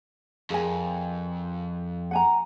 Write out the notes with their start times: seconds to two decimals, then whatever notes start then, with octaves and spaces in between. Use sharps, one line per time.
0.50 F2 G#4 A#4 G#5
2.11 F#5 G#5 A#5